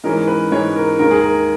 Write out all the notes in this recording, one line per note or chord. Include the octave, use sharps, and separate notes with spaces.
G#2 E3 G#3 C#4 A#4
B4
G#2 E3 G#3 C#4 C#5
A#4
D#2 D#3 G#3 A#4
G#4
A#4